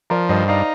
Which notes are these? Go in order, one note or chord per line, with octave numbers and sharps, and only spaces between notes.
F3 A#4 D5
G2 C5 D#5
D#4 D5 F5